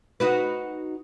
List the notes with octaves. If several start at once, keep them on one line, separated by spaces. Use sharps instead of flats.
D#4 F#4 B4